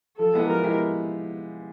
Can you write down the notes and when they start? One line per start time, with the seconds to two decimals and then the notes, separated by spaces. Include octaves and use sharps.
0.19 F3 A4
0.34 G#3 B3 E4 G4
0.49 F3 A#4
0.64 G#3 B3 E4 G4